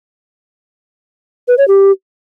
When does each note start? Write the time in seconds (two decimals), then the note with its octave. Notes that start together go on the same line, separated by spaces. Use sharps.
1.48 B4
1.58 C#5
1.68 G4